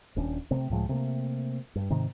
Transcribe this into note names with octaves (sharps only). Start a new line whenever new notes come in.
D#1 C#4 D4
C3 A3 C4
C#2 A2 F3 G#3
C3 A3 A#3
G2
G#2 C3 D#3